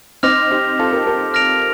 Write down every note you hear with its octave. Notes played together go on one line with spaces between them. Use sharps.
C4 D#4 D6 F6 A#6 F7
D#4 G4
F4 A4
G4 A#4
G4 A#4
F6 A#6 D7 F7